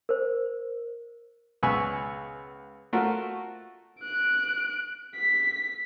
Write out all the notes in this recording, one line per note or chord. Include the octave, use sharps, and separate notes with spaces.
A#4 C5
C#2 B3 G#5 B5 C#6 E6
A3 F4 F#4 A#4
F#6 D7
B6